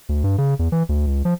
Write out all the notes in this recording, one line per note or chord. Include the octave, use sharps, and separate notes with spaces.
D2
G2
C#3
E2
E3
D2
C#2
F3